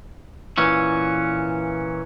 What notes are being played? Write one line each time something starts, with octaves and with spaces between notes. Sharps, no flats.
A#2 E3 C#4